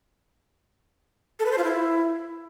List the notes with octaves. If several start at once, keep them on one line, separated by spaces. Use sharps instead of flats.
A4
B4
C5
F4
E4